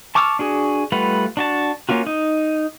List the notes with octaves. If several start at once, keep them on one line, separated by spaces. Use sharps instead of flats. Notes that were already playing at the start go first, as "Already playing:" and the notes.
A5 C#6 D6 E6 F6
D4 F#4 G#4
G3 A3 F4 B4 F#5
D4 F#4 A5
A#3 C#4 F4 F#4
D#4